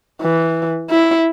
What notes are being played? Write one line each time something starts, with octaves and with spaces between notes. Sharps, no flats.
E3
E4